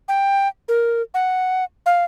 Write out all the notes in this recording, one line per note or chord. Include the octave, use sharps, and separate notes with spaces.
G5
A#4
F#5
F5